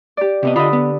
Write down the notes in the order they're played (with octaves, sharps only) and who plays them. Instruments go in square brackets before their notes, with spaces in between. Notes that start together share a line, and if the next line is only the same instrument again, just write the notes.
[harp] G4 D5
[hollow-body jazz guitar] C3 B3 D#5
[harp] D3 B5 D#6 [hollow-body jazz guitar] F4 D#5
[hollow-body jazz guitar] B3